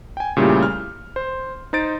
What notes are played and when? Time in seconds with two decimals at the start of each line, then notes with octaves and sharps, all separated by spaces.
0.17 G5 G#5
0.37 A#2 C#3 G3 A3 E4 G4
0.63 F6
1.16 C5
1.73 D#4 C5 A6 D7